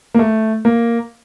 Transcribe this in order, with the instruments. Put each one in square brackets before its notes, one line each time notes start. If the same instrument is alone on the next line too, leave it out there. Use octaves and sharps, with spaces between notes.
[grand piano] A#3
A3
A#3